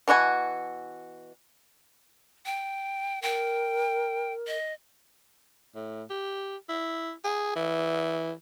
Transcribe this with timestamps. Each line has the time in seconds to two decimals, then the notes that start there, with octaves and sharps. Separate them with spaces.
0.08 B2 E3 F#4 G#5
2.46 G5
3.22 A#4 G5
4.47 D#5
5.75 A2
6.10 G4
6.69 E4
7.24 G#4
7.55 E3